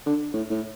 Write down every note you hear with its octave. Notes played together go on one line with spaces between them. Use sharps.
D3
A2
A2